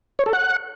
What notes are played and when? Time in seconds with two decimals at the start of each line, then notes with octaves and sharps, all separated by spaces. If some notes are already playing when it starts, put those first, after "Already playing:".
0.19 C#5
0.26 A4
0.33 F#5